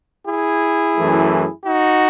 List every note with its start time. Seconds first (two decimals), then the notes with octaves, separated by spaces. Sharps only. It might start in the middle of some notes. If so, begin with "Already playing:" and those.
0.27 E4 G#4
0.96 F#2 E3 A3
1.66 D#4 F#4